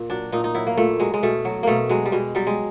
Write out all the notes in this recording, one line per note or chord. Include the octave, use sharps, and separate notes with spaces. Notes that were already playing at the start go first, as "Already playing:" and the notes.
Already playing: A#2
F#3 D4
A#2 D#4
D#4
F#3 E4
A#3
A#2 A3
F#3 G#3
G#3
B2 A3
F#3
B2 A3 A#3
F#3 G#3
G3
B2 G#3
F#3 G3
G#3